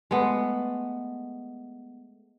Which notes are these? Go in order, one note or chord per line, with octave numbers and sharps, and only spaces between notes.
G#3 A3 B3